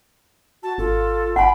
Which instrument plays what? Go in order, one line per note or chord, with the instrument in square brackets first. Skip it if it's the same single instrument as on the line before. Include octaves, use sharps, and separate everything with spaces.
[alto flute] F#4 [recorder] A5
[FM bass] G#1 [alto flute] F4 [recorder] A4
[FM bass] G1 [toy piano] F#5 G#5 [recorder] B5